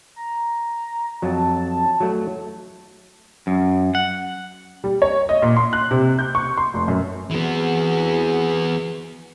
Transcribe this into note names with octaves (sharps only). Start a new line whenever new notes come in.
A#5
F2 F#3 A5
F#3 A3
F#2
F#5
G3
C#5
D#5
A#2
C6
F#6
C3
G6
C#6
C6
F1
F#2
E3 B3 C4 F#4 G#4